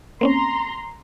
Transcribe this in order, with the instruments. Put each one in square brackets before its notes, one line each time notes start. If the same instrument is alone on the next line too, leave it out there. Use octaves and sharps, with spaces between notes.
[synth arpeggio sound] A#3 C4 C#4 [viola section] A#5 C6